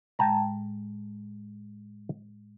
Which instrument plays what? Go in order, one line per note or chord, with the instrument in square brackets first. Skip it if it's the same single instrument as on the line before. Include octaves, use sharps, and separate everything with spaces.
[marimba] A2 G#3 [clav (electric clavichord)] G5 A5 A#5